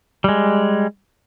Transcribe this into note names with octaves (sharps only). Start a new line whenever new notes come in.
G3 G#3